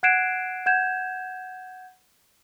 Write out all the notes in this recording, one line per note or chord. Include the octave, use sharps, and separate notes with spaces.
F#5 F#6 G#6 C7 D7 E7
F#5 G6 G#6 E7